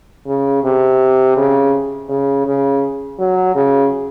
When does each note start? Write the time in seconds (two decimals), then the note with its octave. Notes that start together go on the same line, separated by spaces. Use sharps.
0.27 C#3
0.64 C3
1.37 C#3
2.10 C#3
2.46 C#3
3.19 F#3
3.56 C#3